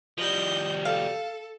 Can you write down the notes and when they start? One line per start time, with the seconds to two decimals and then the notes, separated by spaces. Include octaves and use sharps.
0.18 F3 G3 D#5 G6
0.85 A4 F5